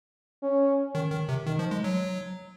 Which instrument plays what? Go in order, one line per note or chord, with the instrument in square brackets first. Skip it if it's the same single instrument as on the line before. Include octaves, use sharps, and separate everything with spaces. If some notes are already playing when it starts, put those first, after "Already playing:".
[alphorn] C#4
[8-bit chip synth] D#3
D#3
C3
[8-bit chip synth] D#3 [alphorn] D#4
[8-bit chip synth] F3
G#3
F#3